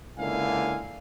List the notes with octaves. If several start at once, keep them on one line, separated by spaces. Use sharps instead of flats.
C#2 D3 A#3 E4 F5 G#5